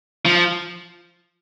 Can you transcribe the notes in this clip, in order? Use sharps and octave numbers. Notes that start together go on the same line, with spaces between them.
F3